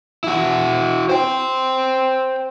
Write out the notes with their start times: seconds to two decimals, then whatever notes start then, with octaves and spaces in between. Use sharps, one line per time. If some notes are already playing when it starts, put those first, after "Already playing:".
0.24 E4 F#4
1.09 C5 G5